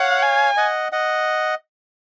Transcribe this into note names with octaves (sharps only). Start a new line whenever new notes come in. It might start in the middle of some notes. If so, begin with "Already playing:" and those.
Already playing: C#5 F5 F#5
G#5
D#5 F#5
D#5 F#5